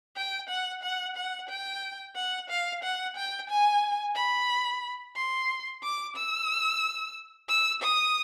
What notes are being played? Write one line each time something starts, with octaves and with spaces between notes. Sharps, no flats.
G5
F#5
F#5
F#5
G5
F#5
F5
F#5
G5
G#5
B5
C6
D6
E6
E6
D#6